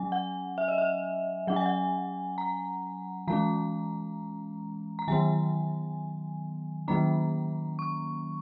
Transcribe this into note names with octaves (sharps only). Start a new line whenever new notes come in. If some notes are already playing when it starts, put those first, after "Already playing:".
Already playing: F#3 C#4 G#5
F#5
E5
D#5
E5
F#3 C#4 F#5
G#5
F#5
A#5
E3 G#3 C#4 A#5
A#5
D#3 F#3 B3 G#5
D#3 F#3 A#3 C#4 A#5
C#6